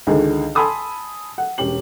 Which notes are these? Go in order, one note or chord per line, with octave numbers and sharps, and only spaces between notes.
C#2 D3 D#3 G#4
G#5 A5 B5 C6 D#6 E6
F#5
E1 C#4 G4 F#7